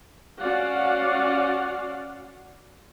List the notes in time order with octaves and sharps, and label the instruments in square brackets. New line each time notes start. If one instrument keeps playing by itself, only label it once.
[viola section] C#4 F#4 D5 F5 F#5